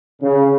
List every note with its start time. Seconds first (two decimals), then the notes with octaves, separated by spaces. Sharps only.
0.22 C#3